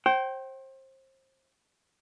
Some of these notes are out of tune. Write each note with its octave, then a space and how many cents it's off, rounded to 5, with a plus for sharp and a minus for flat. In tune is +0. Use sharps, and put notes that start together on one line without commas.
C5 +30 G5 -25